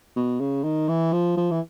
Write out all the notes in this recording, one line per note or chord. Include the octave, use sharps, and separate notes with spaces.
B2
C#3
D#3
E3
F3
F3
E3